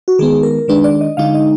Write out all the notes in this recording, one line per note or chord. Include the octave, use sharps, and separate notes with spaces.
F#4
D#3 G#3 B3 G#4
A#4
D#3 G#3 D4 B4
D5
D#5
D3 G#3 D#4 F5
D#5